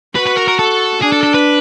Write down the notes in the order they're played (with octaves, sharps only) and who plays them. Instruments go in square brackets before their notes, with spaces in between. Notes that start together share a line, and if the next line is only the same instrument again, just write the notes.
[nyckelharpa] F#4 [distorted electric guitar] B4
[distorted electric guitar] B4
A#4
A#4
A4
[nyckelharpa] D4 [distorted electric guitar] G#4
[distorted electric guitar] A4
A4
B4